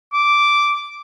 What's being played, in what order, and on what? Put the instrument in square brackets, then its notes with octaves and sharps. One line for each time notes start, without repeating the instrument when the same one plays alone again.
[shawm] D6